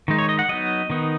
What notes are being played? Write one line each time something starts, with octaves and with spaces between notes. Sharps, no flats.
D#3 G#3 D#4
C#5
D#5
F#5
F#3 B3 D#4 D#5
D#3 B3 D#4